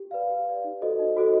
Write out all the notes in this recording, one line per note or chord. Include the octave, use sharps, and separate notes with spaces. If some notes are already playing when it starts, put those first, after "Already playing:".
Already playing: G4
B4 D5 F5
G4
B4 D5 F5
D#4
F#4 A4 C5 D#5
D#4
F#4 A4 C5 D#5